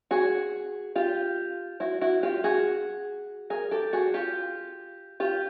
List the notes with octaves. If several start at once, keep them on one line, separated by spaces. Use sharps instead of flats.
F#4 G#4
F4 G4
E4 F#4
E4 F#4
F4 G4
F#4 G#4
G#4 A#4
G4 A4
F#4 G#4
F4 G4
F4 G4